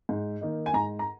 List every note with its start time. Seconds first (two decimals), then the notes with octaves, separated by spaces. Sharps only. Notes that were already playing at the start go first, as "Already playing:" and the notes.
0.09 G#2
0.41 D#3 A#3 D#4
0.66 G#5
0.74 G#2 A#5
0.99 A#5